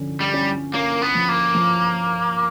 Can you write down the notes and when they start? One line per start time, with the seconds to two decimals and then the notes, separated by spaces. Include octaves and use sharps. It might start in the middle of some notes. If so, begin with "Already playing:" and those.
Already playing: D3 F3 C#4
0.21 G3
0.34 C#4
0.74 A#3 C#4
1.02 B3
1.15 F3
1.29 A#3
1.55 F3